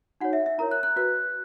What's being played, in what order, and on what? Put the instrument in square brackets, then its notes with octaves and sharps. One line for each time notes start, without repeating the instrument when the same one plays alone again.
[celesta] D#4 F#4 C#5 F#5
E5
E5
E4 A#4 C#5 A#5
F#6
F#6
F#4 B4 F#6